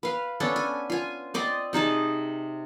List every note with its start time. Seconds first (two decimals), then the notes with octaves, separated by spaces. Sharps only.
0.03 B4 F5
0.40 B3 C#4 D4 A4
0.56 G#5
0.90 F4 G#5
1.34 C4 D5 D#5 C6
1.73 C3 D#4 G#4 A5